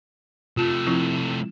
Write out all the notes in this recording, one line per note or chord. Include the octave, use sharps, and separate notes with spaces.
C3 A3 F4 A5
F3 C4 E4